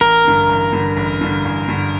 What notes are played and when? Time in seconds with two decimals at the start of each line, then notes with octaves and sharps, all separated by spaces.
0.01 A1 A#4
0.25 G2 D3
0.49 A1
0.73 G2 D3
0.97 A1
1.21 G2 D3
1.45 A1
1.68 G2 D3